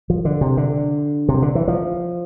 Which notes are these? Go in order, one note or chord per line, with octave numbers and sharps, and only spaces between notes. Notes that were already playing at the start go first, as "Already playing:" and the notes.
F3
D3
C3
D3
C3
D3
E3
F3